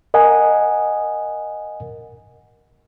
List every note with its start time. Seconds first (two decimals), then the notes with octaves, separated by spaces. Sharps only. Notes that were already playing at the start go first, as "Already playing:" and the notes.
0.14 A#4 D#5 F#5 G#5